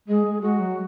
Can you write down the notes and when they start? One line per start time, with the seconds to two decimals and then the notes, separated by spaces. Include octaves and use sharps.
0.08 G#3 G#4
0.25 G#3
0.41 G#3 F#4
0.59 F#3